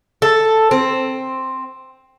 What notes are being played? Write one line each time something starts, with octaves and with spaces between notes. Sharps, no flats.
A4
C4